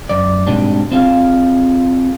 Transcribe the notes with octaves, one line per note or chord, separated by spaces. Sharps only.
F#2 D5
G#2 B2 G3 C4 D4
C4 F4 G#4 F5